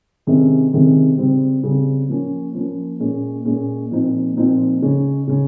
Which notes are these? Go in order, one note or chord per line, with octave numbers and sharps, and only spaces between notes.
C3 D#3 G#3 C#4
C3 D#3 G#3 C#4
C#3 G3 C4
C#3 G3 C4
F3 A#3 C#4
F3 A#3 C#4
A#2 G#3 C#4
A#2 G#3 C#4
A#2 F3 C4 D#4
A#2 F3 C4 D#4
C#3 G#3 C#4
C#3 G#3 C#4